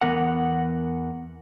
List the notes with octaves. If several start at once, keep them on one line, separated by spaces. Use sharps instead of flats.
E2 G#2 E3 B3 A#4 F#5